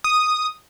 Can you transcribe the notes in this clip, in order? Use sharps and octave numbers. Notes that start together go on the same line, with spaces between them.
D#6